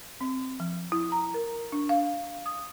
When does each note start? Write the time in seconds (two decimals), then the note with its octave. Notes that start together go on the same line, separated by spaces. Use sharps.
0.21 C4
0.60 F3
0.92 E4
1.12 A#5
1.34 A#4
1.72 D4
1.89 F5
2.46 D#6